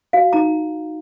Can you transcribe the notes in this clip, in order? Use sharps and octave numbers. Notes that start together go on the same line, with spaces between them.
F#4 F5
D#4 A#5